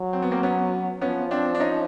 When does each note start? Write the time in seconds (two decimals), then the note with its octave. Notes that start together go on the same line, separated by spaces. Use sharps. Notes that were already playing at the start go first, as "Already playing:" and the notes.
Already playing: F#3
0.13 C4
0.22 B3
0.31 A#3 C4
0.43 B3 C#4
1.01 F3 B3 C#4
1.31 C4 D4
1.55 D4
1.60 C#4 D#4